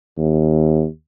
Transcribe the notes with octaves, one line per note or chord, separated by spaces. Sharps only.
D#2